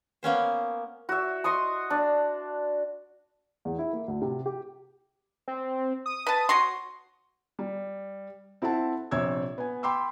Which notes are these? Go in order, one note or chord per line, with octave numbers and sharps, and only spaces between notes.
A#3 B3 C#4 C5
F#4 E5
D#5 C6 C#6 D#6
D4
E2
E4
A#3
D2
C3
G4
C4
D#6
B4 A5
F#4 C#5 C6
G3
C4 E4 A4 F#5 A5
A#1 C3 C#5 E6 G#6
B3 G#5
G5 B5 C6 D6 E6